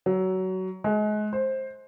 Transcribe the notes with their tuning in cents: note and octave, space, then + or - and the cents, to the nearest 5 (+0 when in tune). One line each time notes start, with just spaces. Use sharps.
F#3 +20
G#3 +30
C5 +10